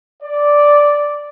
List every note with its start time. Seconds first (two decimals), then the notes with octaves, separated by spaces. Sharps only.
0.23 D5